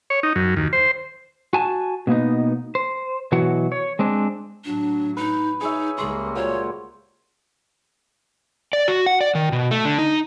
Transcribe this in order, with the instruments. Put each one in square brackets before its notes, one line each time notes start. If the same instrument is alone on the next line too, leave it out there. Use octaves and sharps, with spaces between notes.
[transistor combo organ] C#5
D#4
F#2
D#2
C5
[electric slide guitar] F#4 G#5 A5
B2 A#3 B3 D#4
C5
B2 E3 F#3 F#4 F#5
C#5
G#3 C4 D4
[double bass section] A2 F#3 [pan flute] D4
[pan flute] D#4 [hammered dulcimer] B4
[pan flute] D#4 [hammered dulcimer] G#4 C#5 E5
[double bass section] C#2 G3 A#3 [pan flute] G#4 [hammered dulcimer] C#5 C6
[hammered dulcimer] A#2 F#4 C5 [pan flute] C#5
[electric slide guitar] D5
F#4
F#5
D5
D#3
B2
A3
D3
D#4